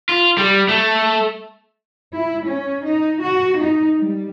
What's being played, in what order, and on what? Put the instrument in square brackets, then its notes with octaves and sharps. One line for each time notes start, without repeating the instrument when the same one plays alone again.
[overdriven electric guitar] F4
G3
A3
[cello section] E4
C#4
D#4
F#4
D#4
G3